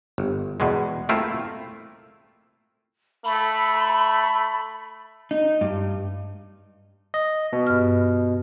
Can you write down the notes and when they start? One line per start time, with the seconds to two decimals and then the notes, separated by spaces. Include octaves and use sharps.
0.18 G1
0.60 E2 B2 G#3
1.09 A3 A#3 C4 E4 F4
3.25 A3 B5
5.31 D#4
5.61 G2
7.14 D#5
7.53 B2
7.67 G2 F6